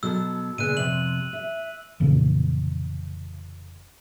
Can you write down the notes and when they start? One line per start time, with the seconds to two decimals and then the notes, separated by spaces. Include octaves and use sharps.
0.03 B2 F#3 A4 E6
0.58 A#2 C#3 B3 F#6 D#7
0.77 F2 C3 F#7
1.33 E5
2.00 F1 A#2 C#3 E3